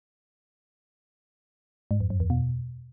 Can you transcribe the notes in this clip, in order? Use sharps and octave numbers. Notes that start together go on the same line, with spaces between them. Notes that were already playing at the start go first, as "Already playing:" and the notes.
G#2
F2
F#2
E2
B2